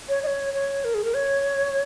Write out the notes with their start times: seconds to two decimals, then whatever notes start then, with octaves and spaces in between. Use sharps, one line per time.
0.09 C#5
0.23 D#5
0.27 C#5
0.54 C#5
0.84 A#4
0.94 G#4
1.04 A#4
1.14 C#5